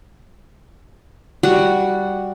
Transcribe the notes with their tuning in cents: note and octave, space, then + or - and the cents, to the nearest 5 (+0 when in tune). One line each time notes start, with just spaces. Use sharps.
G3 +0 F#4 +0